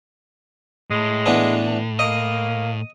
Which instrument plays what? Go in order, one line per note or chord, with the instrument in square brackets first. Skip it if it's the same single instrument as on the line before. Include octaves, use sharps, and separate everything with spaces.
[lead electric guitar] A2 [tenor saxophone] G#3
[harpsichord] E3 B3 D4
[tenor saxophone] A#3 [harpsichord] D#5